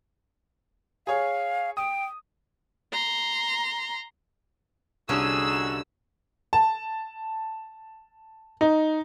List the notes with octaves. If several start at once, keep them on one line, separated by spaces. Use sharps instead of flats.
G#4 C#5 F5 G#5
G5 D#6
A#5 C6
C2 D3 C#4 D#4 F#4 G#4 E6
A5
D#4